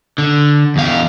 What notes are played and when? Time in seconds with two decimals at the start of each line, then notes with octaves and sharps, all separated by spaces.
0.18 D3
0.76 E2 F5